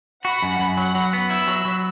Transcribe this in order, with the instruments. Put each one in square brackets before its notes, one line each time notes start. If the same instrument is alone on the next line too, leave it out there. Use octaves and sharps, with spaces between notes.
[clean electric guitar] F#4 [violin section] F#5 B5
[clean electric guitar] F#2
F#2
[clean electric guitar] F#3 [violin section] F#5 B5
[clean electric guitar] F#3
B3
[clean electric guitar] E4 [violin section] B5 E6
[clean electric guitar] F#3
F#3